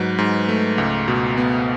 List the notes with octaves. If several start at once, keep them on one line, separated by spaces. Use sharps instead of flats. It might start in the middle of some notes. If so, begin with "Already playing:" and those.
Already playing: G#2 F#3 B4
G#2
A3
C#2
B2
B3